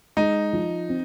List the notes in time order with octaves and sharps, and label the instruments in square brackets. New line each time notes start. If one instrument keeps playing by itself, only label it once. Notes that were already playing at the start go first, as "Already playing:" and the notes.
[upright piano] G#3 [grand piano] D#4
[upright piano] F3
C4